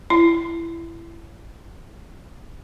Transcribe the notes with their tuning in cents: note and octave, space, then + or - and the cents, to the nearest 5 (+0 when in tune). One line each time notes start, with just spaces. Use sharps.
E4 +20